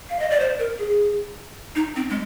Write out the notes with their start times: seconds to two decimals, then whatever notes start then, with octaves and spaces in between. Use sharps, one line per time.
0.10 F5
0.19 D#5
0.30 D5
0.40 C5
0.59 A#4
0.79 G#4
1.76 D#4
1.96 C4
2.10 G#3